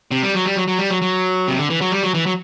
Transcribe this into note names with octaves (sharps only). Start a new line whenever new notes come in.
C3
G3
F#3
G3
F#3
F#3
G3
F#3
F#3
C3
D3
E3
F#3
G3
F#3
E3
F#3